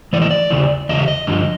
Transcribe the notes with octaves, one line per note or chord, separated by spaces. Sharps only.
A2 E3 D5
D#5
D5
E2 C#3 E3
E2 C#3 D#5
E5
D#5
G2 D3 F3